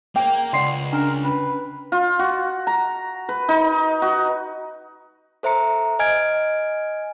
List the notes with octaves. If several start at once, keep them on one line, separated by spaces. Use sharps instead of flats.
A#3 G#4 C5 G5
C#2 F4 D5 F#5 C6 C7
C#4 D4 A#4 A#5
C#4 B4
F4
F#4
A#5
B4
D#4
F#4
A4 C5 E5 A#5 C#7
D#5 G#5 F6 G#6 D7